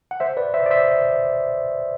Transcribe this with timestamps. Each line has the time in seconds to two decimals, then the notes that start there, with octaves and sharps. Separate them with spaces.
0.11 F#5
0.20 C5 E5
0.37 B4 D5
0.54 C5 E5
0.66 D5
0.70 C5 E5